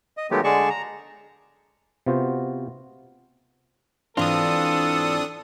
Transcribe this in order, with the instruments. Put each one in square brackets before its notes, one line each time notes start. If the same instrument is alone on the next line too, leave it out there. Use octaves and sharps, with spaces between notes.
[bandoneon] D#5
D#3 F#3 G#3 A3 B3 G4
D3 G#3 G#4 D5 A5 C#6
A#5
[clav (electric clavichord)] C3 B3 F4 F#4 C5
[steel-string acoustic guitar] G#2 E3 [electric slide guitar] C4 F4 [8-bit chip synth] D4 D#6 [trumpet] A4